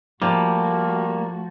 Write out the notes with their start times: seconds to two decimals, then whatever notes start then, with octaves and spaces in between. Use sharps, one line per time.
0.22 F3 G3 A3 A#3 F#4